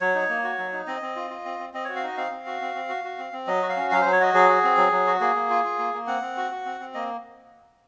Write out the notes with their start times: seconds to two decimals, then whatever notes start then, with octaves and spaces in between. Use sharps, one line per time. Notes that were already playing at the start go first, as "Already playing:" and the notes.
0.01 F#3 C#5
0.15 D#4
0.29 A#3
0.44 F#4
0.58 F#3
0.73 D#4
0.87 C4 D#5
1.02 C4
1.16 F4
1.30 F4
1.45 C4
1.59 C4
1.74 C4 D#5
1.85 F#4 C#5
1.96 F5
2.03 D#4 D#5
2.17 C4 F5
2.31 C4
2.46 F#4
2.61 C4
2.75 C4
2.89 F#4
3.04 F#4
3.18 C4
3.33 C4
3.47 F#3 D#5
3.62 F#4
3.69 F5
3.76 C#4
3.91 F#3 F5
4.01 F#3 C5
4.12 C#5
4.20 F#4 D#5
4.34 F#3 G#4
4.49 F#4
4.64 C4
4.77 F#3
4.92 F#3
5.07 F#4
5.20 A#3 G#4
5.35 A#3
5.50 F4
5.64 F4
5.79 A#3
5.94 A#3
6.07 C4 F#5
6.22 C4
6.37 F#4
6.51 F#4
6.66 C4
6.80 C4
6.94 A#3 D#5